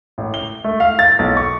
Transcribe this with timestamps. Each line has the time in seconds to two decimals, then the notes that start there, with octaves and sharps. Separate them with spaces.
0.18 A1
0.34 G7
0.64 A3
0.80 F5
0.99 A6
1.19 B1
1.37 C#6